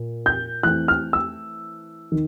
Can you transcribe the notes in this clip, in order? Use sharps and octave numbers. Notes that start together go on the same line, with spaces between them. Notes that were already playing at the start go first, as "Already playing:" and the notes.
Already playing: A#2
G6
E3 A3 C4 F#6
F6
E6
D#3